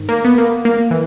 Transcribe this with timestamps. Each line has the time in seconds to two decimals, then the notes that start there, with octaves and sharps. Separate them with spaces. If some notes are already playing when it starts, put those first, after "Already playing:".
Already playing: G#2 D#3
0.09 A#3
0.25 B3
0.38 A#3
0.65 A#3
0.91 E3